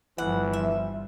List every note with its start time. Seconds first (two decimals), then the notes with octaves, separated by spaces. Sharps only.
0.18 G1 E3 F3 G3 F#5
0.53 E5